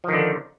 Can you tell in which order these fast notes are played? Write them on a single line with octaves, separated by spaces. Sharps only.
F3 D#3 D3